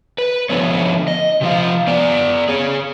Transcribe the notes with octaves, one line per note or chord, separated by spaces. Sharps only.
B4
D3 F3 A3 B3 C#5
D#5
C3 F3 F5
B3 D5
G#4 C#5